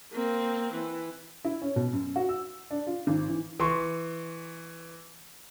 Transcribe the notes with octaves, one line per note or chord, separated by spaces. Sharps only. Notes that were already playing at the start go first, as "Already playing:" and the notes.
A#3 C4
E3
E4
C#4
B2
F#2
F#4
E6
D4
F4
G#1
E3
E3 C6 C#6